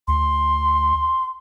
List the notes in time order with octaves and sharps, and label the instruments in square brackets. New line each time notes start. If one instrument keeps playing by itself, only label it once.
[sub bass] D2 [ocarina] C6